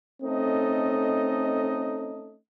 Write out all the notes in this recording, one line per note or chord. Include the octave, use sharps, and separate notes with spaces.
A3 C4 C#4 D#4 A4 D#5